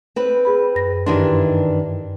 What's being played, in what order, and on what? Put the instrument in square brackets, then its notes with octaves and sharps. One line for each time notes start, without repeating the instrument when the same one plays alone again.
[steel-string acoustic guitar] C4 B4
[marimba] G#4 B5
F#2 A#6
[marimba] G2 G4 C6 [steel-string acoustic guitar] D#3 E3 D4